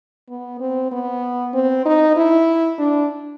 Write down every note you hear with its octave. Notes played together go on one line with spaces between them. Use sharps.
B3
C4
B3
C4
D#4
E4
D4